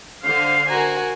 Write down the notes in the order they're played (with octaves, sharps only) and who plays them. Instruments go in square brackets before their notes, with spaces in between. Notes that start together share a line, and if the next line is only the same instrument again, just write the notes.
[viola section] D3 C5 F5 [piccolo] C7
[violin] F#4 A#4 [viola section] G#5 [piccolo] A#5